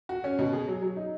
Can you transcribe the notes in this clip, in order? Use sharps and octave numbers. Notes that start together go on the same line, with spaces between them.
F#4
C#4
B2
G#4
F#3
F#3
D#4